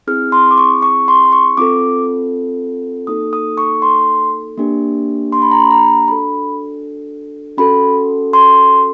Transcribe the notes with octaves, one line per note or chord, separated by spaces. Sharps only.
C4 E4 G#4 F6
C6
D6
C#6
C#6
C6
C#6
C4 F4 A4 D6
A#3 D#4 F#4 A4 D#6
D#6
C#6
C6
A#3 D4 G4
C6
B5
A#5
B5
A#5
D4 F#4 A4 B5
C#4 F#4 A4 B5
C6